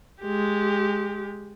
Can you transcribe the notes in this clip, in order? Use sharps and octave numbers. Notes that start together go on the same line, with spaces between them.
G#3 G4